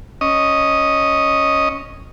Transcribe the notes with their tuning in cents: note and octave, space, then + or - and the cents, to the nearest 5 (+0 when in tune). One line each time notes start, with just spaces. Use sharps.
C#4 +0 D#5 +0